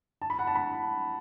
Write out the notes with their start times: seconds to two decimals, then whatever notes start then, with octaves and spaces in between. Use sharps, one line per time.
0.22 A5
0.30 B5
0.39 F#5
0.47 A5
0.55 B5